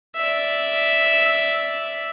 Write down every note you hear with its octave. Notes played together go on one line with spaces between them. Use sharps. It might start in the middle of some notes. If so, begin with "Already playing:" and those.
D5 E5